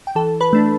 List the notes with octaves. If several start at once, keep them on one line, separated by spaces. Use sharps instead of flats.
G5
E3 A4 A5
B4 B5
A3 D4